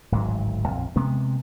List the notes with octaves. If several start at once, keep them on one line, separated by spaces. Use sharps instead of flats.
D1 G#1 G#2 F#3
A#1 F2
C3 G#3 B3